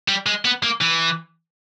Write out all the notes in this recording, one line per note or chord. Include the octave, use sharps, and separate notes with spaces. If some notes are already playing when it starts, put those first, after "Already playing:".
G3
G#3
B3
A#3
E3